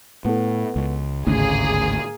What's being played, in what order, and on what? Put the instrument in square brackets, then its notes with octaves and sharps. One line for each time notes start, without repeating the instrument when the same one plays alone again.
[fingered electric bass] A2 [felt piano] B3 E4 A4
[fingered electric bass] C#2
[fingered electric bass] G#1 D2 [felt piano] A2 C#3 [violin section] A#3 G#4